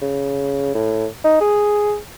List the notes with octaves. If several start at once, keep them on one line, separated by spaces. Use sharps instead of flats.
C#3
A2
D#4
G#4